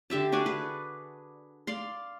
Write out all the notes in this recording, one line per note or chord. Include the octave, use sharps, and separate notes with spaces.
D3 G4 E5 A5
D4 F#4 D5 G#5
G#4 B4
D5 F5 C6